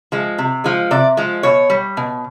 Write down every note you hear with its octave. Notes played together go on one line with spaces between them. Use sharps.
F3 G#3
C3
F3 G#3
C3 D5
F3 G#3
B2 C#5
G3
B2